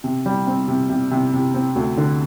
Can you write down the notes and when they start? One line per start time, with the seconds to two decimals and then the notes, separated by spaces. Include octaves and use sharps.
0.04 C3
0.26 G3
0.47 C4
0.68 C3
0.90 C3
1.11 C3
1.33 C3
1.54 C4
1.76 D2
1.97 D3